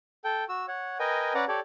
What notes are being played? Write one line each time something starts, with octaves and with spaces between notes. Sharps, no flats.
A4 G5
F#4 E6
C#5 F#5
A#4 B4 D#5 G5 G#5
C#4 B4 D5 F#5 A#5
G4 A4 C#5 D5